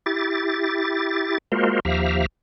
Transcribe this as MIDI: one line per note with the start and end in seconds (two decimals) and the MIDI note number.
0.06 1.38 64
0.06 1.38 67
0.06 1.38 93
1.52 1.80 56
1.52 1.80 58
1.52 1.80 65
1.52 1.80 66
1.52 1.80 70
1.52 1.80 72
1.85 2.26 39
1.85 2.26 53
1.85 2.26 67
1.85 2.26 76
1.85 2.26 77
1.85 2.26 82